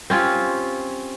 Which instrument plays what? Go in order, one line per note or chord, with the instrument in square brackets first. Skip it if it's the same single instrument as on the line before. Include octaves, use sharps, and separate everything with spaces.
[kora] C4 C#4 F4 G4